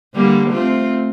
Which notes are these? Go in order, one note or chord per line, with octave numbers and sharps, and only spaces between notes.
D3 G3 A#3
A3 C4 F4